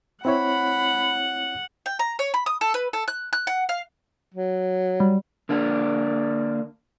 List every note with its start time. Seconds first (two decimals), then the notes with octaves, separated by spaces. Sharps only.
0.25 C4 E4 C#5 F#5 B5
1.86 G5
1.99 A#5
2.19 C#5
2.34 B5
2.46 D#6
2.61 A4
2.74 B4
2.93 A4
3.08 F#6
3.33 F#6
3.47 F#5
3.69 F5
4.35 F#3
5.00 G3
5.49 D3 A#3 D4